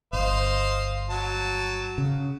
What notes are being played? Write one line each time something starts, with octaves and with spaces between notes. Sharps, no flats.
G1 C5 D#5 F5
F#3 A5
C#3